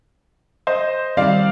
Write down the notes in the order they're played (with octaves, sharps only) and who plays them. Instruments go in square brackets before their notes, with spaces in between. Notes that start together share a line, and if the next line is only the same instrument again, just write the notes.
[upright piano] C5 D#5
[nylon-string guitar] D#3 G3 C4 [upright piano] D5 F5